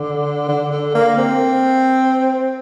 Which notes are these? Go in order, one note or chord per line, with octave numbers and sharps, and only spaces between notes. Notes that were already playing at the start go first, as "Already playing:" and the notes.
Already playing: D3
D3
D3
A#3
C4